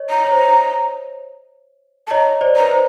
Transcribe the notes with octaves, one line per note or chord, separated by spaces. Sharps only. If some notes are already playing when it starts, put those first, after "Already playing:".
Already playing: C#5 D#5
A#5
C#5
C5
A5
C#5 D#5 A#5
C5 D5
B4 A#5
C5